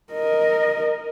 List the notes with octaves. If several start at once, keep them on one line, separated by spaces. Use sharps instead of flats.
A#4 D#5